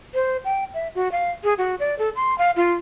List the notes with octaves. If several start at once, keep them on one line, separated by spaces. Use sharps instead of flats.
C5
G5
E5
F#4
F5
G#4
F#4
D5
A4
C6
F5
F4